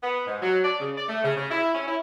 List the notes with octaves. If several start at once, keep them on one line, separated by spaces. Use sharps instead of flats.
B3
G#2
F#3
D5
C#3
D5
A3
C#3
C#3
E4
C#4
E4